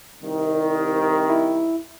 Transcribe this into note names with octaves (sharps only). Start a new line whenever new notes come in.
C2 D#3
E4